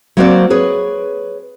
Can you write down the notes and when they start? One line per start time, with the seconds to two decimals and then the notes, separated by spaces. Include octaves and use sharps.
0.17 F#3 A#3 C4 F#4 C5 D5
0.50 G#4 B4 C#5